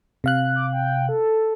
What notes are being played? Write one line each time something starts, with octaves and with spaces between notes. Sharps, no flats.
C3 F5 F#6
D6
G5
A4